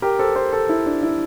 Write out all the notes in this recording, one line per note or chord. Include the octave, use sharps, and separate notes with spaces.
G4 A#4
A4 C5
A4 C5
A4 C5
E4
D4
E4